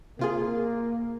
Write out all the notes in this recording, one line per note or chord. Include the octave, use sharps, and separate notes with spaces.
C3 A#3 F4 G#4